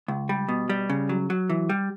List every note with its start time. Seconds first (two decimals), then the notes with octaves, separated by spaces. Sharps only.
0.08 C#2
0.29 G3
0.48 B2
0.70 G3
0.90 C#3
1.09 F#3
1.30 F#3
1.50 E3
1.69 G3